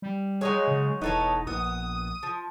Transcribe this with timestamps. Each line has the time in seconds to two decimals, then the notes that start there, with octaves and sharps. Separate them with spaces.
0.02 G3
0.41 F#3 G#3 D#4 C#5
0.68 C#3
1.02 E1 B3 D#4 A4 C#5
1.47 A#1 B3 D#6
2.23 F3